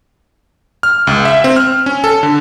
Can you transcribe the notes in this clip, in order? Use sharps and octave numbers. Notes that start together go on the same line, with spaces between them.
F6
C#2
E5
C4
F6
C#4
A4
D3